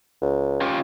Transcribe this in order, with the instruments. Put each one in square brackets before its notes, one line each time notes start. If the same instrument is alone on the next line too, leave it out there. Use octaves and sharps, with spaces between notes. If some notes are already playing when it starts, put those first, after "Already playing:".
[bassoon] C#2
[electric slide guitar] C#4 F4 G4